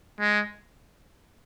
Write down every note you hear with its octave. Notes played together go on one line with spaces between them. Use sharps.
G#3